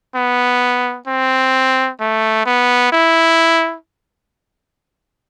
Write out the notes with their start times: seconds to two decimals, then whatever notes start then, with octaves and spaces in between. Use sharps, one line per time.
0.15 B3
1.07 C4
2.00 A3
2.46 B3
2.92 E4